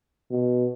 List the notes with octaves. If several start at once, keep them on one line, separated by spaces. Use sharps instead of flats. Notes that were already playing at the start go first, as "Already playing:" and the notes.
B2